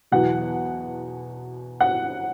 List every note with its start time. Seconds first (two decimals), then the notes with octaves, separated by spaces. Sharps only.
0.11 E2 B2 F#3 F#5
1.81 F#5